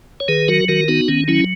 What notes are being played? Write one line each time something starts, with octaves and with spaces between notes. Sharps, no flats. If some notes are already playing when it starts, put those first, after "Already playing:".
C#5
D#3 G#4 B4
F#3 F#4 A#4
D#3 F#4 A#4
B3 D#4 F#4
D#3 C#4
F#3 C#4 E4